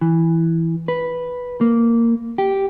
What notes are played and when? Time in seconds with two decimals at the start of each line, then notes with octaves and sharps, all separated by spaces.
0.01 E3
0.88 B4
1.61 A#3
2.38 G4